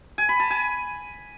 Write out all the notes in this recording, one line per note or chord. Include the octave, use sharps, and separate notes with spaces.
G#5
B5
A5
G#5